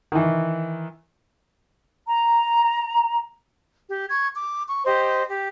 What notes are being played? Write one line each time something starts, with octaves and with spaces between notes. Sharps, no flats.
D#3 E3
A#5
G4
C#6 G#6
D6
C#6
G4 C5 D#5
G4